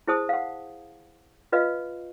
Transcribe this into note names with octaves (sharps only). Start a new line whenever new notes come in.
E4 G#4 C5 A5 D#6
F5 F#5
F4 B4 D#5 F5